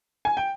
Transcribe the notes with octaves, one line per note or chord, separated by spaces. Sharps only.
G#5
G5